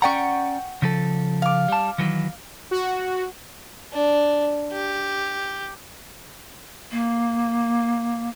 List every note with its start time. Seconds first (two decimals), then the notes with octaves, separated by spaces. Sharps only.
0.02 C#4 D5 F#5 G5 A#5 C#6
0.82 C#3 F3 A4
1.42 F5 D6
1.68 G3 A5
1.98 D#3 E3 F#3
2.71 F#4
3.92 D4
4.72 G4
6.91 A#3